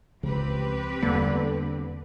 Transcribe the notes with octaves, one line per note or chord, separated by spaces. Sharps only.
C#2 C#3 F3 C4 G4 B4
E2 D3 G3 A#3